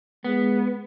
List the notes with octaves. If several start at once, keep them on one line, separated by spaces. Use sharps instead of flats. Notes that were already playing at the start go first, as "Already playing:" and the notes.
G#3 B3